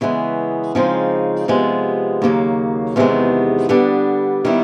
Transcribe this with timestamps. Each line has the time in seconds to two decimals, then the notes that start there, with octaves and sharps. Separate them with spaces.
0.01 C#3 E3 G#3 B3
0.75 C#3 F3 G#3 C4 D#4
1.48 C3 F3 G#3 B3
2.22 D#2 C#3 F#3 A#3
2.96 E2 C3 D#3 G#3 B3
3.69 D3 G3 B3 D4
4.45 D#3 G3 B3 E4